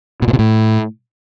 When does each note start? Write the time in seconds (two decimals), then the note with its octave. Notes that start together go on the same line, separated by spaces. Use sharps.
0.22 B2
0.28 A#2
0.33 C3
0.39 A2